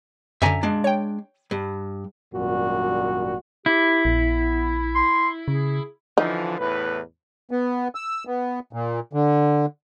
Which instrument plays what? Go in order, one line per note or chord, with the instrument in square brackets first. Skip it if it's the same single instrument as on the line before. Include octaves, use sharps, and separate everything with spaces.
[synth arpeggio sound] F#2 D3 [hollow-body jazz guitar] E5 G#5 A#5
[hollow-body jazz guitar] G#3 D4
[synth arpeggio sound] C#5 G5
[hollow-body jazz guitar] G2
[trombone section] G#1 F#2 A#2 G3 F#4
[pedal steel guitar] E4 [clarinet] G4
[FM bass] A#1 [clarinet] B3
[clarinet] C6
[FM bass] C#3 [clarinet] G#4
[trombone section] D3 E3 F3 [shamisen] D#4
[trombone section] E2 A2 B4
[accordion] B3
E6
B3
A#2
D3